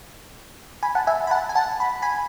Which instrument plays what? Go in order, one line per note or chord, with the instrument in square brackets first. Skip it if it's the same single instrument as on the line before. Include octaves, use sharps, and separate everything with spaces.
[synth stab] G#5 B5
F#5 A5
E5 G#5
B5
F#5 A5
G#5
F#5 A5
B5
G#5 B5